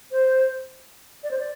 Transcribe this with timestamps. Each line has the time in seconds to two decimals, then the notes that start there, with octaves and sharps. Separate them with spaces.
0.12 C5
1.24 D5
1.31 C5
1.39 D5